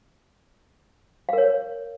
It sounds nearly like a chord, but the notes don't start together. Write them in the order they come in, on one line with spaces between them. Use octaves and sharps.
F5 A#4 C#5